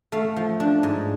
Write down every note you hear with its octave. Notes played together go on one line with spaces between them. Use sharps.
A3 F5
F3
D4
G#2